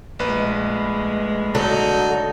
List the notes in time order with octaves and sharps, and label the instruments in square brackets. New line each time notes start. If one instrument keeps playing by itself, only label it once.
[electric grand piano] A#1 B4 [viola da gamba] G#3 A3
[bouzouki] D3 [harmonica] F#3 D#4